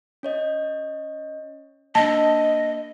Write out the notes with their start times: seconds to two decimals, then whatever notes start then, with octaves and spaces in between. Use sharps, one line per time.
0.23 C#4 C#5 D#5
1.95 A#3 D4 D#5 A5